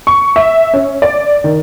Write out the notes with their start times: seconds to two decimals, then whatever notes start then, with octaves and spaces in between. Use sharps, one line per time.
0.07 C#6
0.36 E5
0.74 C#4
1.02 D5
1.44 D#3